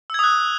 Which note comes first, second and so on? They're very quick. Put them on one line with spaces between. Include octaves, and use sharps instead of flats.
E6 G#6 D#6 F#6